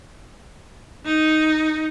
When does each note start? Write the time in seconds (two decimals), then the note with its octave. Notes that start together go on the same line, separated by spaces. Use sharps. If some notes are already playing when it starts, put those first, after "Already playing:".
1.05 D#4